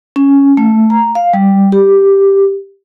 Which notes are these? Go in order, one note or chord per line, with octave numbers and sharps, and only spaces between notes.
C#4
A3
A#5
F5
G3
G4